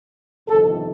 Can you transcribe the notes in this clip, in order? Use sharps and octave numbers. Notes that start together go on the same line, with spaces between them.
G1 F2 C3 D#3 A4